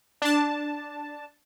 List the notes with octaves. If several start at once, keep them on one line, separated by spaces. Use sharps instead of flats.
D4 A5